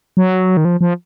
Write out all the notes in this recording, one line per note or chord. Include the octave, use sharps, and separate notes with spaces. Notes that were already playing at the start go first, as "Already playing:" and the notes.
F#3
D#3
F3
F3